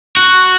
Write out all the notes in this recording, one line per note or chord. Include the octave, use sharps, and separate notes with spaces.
F#4